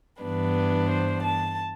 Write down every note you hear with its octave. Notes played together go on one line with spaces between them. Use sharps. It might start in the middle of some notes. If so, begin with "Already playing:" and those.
G2 E3 B3 D4 B4
C5
A5